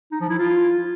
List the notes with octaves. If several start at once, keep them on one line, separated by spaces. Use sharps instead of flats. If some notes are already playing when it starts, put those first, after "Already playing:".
D#4
F3
E4
F4